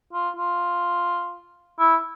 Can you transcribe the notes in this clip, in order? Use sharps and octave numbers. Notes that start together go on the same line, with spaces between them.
F4
F4
E4